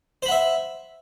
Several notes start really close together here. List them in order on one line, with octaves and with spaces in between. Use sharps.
C5 B5 F#5 E5